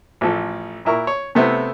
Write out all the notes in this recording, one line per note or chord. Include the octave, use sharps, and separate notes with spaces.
A1 F3 A4
A#2 E4 A#4 C#6
C#5
C3 A3 B3 C4 E4